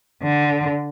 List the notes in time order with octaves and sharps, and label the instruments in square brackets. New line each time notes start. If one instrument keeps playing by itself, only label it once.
[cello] D3